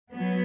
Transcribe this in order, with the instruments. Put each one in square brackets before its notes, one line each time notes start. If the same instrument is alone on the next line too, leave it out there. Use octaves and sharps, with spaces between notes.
[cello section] F#3 B3